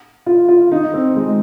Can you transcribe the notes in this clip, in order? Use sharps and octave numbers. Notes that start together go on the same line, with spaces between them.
F4
F4
D#4
C4
G#3